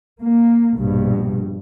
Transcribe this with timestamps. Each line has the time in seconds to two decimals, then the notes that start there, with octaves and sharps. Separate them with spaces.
0.19 A#3
0.77 A#1 G2 B2